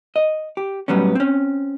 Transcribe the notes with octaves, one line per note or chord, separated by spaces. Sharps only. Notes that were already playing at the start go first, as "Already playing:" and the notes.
D#5
G4
A2 F#3 G3 B3 C#4
C4 C#4